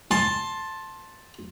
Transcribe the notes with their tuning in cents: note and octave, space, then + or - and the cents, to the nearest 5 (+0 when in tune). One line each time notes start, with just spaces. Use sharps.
A5 +0 C6 +15